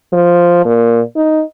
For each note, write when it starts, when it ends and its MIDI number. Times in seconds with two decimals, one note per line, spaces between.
0.13 0.62 53
0.65 1.01 46
1.16 1.43 63